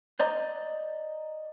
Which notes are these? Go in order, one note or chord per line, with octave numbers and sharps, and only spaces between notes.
C5 D5 D#5 A#5